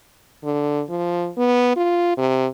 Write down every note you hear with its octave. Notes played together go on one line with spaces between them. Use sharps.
D3
F3
B3
F4
C3